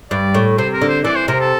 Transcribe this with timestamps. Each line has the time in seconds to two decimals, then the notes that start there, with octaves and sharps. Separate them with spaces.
0.11 G2 D5
0.34 A2
0.58 C3 C5
0.74 A#4
0.81 D3
0.89 C5
1.05 E3 D5
1.16 C5
1.28 C3 A#4
1.40 A4